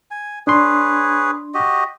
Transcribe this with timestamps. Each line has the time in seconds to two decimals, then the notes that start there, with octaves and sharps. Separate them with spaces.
0.11 G#5
0.47 D4 G#4 B4 C#5 C6
1.54 F#4 G4 D#5